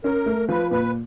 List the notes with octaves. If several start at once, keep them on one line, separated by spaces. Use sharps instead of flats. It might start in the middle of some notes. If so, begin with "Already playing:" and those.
C#4 A#4
A3
F3 B4
A#2 B4